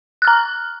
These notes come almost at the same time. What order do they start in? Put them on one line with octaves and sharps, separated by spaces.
F#6 F6 A#5